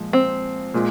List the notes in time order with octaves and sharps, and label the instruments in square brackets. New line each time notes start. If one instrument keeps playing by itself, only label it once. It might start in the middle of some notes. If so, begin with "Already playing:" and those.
Already playing: [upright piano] A#2 F3 G#3
[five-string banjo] C4
[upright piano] A#2 G#3